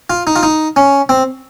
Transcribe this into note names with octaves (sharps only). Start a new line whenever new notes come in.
F4
D#4
F4
D#4
C#4
C4